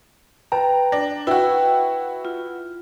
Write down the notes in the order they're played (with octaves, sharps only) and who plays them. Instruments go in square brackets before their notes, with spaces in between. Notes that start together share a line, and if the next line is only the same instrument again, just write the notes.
[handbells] B4 G5 A5 [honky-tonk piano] A#5
[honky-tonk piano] D4 [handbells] A#6
[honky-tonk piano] E4 F#4 [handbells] B4 [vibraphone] G5
[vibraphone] F4